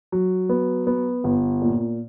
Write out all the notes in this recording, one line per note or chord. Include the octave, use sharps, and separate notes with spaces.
F#3
B3
B3
G1
A#2